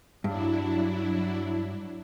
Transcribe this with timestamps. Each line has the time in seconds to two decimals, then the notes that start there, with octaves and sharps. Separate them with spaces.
0.24 G2 F#3 D4 E4